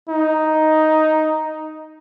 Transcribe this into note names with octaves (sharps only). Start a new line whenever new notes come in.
D#4